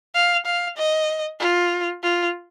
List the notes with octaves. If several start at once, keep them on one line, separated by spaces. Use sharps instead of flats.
F5
F5
D#5
F4
F4